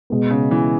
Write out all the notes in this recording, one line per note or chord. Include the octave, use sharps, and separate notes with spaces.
B2 G#3 B3
C#3
E3